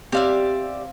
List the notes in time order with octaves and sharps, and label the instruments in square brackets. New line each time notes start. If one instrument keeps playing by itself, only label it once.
[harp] C4 F5 [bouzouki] G4 D5 E5